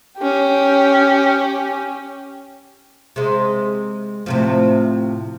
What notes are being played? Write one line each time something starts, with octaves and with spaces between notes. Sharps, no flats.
C#4 G4
C3 G#3
A2 C3 F3